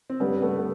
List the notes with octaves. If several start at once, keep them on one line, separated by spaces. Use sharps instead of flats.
C4
G2 D3 G3 B3 C#4
A3 B3
B3